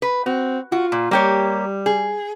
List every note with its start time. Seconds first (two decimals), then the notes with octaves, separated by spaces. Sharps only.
0.02 B4
0.26 C4 F#4
0.72 F4 F#4
0.92 A#2
1.11 G3 A#3 G4 C#5
1.86 G#4